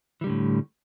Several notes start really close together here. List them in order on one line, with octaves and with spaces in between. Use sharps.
E3 G3 D3 A2